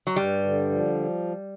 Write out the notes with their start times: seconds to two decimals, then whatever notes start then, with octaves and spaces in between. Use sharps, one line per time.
0.07 F#3
0.16 G2 G3
0.44 D3
0.70 F3